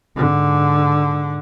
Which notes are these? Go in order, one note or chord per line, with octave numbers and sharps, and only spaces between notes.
G#2 D3